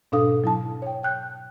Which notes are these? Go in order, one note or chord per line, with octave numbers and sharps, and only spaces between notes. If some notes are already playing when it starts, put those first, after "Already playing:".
G#2 B2 D4 A4 F5 D#6
F#3 E4 A5
C#5 G5
G5 F#6 G6